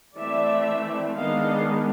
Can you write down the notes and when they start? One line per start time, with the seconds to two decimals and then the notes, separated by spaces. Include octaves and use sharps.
0.16 E3 A3 C4 D5 E5
1.17 D#3 G#3 B3 D4 D#5 F5